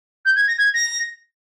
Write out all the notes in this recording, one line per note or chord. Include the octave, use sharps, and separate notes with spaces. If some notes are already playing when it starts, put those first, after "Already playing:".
G6
G#6
A#6
G#6
A#6